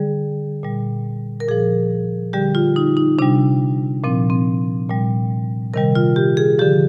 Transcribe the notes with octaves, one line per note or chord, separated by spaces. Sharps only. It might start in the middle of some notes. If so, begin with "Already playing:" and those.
Already playing: D3 G3 G#4
A#2 G3
A#4
A#2 F3 G#4
D3 G3 G4
F4
D#4
D#4
C3 G3 D4
A#2 F3 C4
C4
A#2 G3
C3 D#3 G3 A#4
F4
G4
G#4
D3 F3 G4